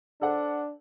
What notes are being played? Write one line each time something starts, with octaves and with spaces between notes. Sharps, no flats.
D4 A4 C5 F#5